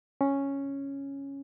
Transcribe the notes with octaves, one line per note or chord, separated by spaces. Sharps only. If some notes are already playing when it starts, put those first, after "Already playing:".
C#4